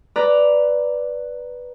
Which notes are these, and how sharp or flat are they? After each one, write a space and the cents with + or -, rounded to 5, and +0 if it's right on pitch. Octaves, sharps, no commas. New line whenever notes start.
B4 +0 D5 +0 A#5 +0